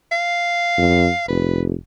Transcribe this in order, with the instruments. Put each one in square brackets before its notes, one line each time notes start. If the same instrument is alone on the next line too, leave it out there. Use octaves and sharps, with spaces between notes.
[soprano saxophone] F5
[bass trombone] F2
[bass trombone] F1 [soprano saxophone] B4